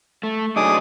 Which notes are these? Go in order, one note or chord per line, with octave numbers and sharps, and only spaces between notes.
A3
F#3 D4 D#4 G#4 D6 D#6